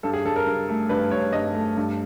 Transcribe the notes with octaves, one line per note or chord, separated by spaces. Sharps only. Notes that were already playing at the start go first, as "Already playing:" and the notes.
G2 A4
G#4
G2 A4
A#4
G2
A3
G2 B4
G2 C#5
G2 D#5
A3
G2